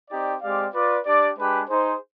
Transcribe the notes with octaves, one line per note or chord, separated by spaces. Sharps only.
C4 D#4 G4 D5
G#3 C4 G4 D5 F5
F4 B4 D5
D4 G4 D5
G#3 D4 G4 B4
D#4 G#4 C5